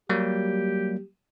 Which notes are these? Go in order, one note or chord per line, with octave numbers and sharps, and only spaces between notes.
F#3 G3 A#3 G4